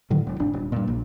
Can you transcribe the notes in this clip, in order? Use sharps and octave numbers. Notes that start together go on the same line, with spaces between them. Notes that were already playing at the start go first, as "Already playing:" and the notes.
A2 D3 D#3 F#3
E1
G#1 D4
D#1
G2 A#2
A#1